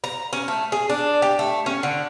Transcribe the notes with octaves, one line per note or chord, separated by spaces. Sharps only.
A#5
C#4
A3
G#4
D4
G4
A3
C#4
D3